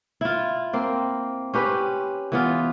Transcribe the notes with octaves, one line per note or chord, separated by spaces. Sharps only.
E4 F4
A#3 C4
C#4 G4 B4 C5
E3 B3 F4